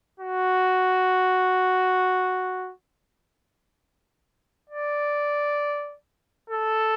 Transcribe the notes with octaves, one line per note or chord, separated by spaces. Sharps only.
F#4
D5
A4